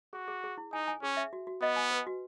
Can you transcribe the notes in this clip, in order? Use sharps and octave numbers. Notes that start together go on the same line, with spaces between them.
F#4 G#4
G#4
G#4
E4
D#4 G#5
G#5
C#4 G#4
E5
F#4
F#4
B3 D#5
G#5
B4
F#4